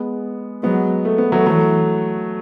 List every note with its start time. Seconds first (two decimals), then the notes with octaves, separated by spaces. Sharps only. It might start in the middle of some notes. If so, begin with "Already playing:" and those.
Already playing: G#3 B3
0.63 F#3 G#3 B3
1.05 A3
1.18 B3
1.32 F#3 A3
1.46 E3 F#3 A3